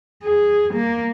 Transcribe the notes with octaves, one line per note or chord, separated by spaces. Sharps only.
G#4
A#3